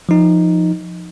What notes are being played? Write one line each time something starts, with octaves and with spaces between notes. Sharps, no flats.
F3 D#4